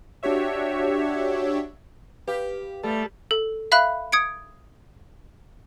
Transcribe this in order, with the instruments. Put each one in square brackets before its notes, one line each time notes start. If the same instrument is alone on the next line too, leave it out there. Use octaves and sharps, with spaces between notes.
[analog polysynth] D4 F#4 G4 C#5 E5
[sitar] G4 [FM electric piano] B4 F5 G5
[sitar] G3 [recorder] A3 [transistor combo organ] A4
[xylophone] A4
E5 F5 B5 F#6
D#6 G#6 C#7 D7